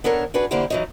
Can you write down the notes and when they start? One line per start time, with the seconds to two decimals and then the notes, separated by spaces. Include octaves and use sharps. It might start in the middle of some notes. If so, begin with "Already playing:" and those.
0.04 B3 D4 A4 A#4 C#5
0.34 D4 F#4 G#4 B4
0.51 D3 A#3 C4 E4 G4
0.70 E3 F#3 D#4